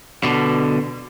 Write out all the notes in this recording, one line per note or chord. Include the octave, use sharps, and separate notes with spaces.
B2 D3